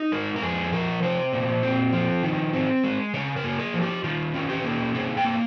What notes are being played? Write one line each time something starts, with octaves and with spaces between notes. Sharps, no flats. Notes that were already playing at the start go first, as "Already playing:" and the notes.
Already playing: D#4
G#3 A#4
A#4
F2 G#4
F3 A#4
C3 C5
A#2
C4
F3
D#3
C4
G#3
C#3 C#5
A#4
A#3
G#4
F3
G4
D#3 F4
C#4
G4
A#3
C3 G#4
G5
A#3